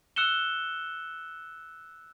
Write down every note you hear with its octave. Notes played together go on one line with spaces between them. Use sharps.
E6 F#6 C#7 E7 G7